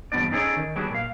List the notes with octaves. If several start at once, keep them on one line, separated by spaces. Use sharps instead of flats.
E2 G2 B2 B3 D4 D5
C#4 D#4 G#4 A4 C#5 D5
D#3
F#3 G3 B3 D4 G#4
A#2 F5